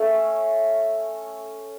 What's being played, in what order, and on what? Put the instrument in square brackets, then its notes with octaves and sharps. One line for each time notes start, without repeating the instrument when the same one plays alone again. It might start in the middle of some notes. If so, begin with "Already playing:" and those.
Already playing: [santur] A3 C#4